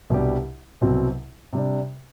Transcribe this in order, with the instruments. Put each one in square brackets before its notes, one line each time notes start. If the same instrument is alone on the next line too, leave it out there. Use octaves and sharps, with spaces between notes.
[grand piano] C2 B2 G3 D4 G4
C2 B2 F#3 C4
C3 G3 D4